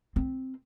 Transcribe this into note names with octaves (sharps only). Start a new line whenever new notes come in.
C4